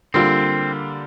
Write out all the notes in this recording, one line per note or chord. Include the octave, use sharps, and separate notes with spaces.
D3 G3 A#3 C4 F4